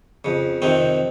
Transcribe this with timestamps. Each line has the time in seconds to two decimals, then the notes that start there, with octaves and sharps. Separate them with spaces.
0.25 F2 C#3
0.62 F2 C3 D#3 C4